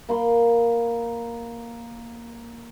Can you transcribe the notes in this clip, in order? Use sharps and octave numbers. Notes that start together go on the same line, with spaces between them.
A#3 B5 C6